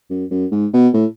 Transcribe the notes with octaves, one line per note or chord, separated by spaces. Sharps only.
F#2
F#2
G#2
B2
A2